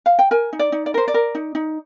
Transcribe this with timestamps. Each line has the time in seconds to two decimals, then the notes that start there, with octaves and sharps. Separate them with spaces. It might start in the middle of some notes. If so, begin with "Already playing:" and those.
0.06 F5
0.19 G5
0.31 A#4 G#5
0.53 D#4
0.59 D5
0.72 D#4
0.86 D5
0.94 A#4 C5
1.08 D5
1.14 A#4
1.35 D#4
1.55 D#4